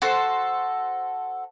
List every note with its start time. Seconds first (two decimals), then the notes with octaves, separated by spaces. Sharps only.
0.02 F#4 A4 C5